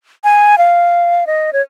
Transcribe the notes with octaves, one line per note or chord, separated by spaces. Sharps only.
G#5
F5
D#5
C#5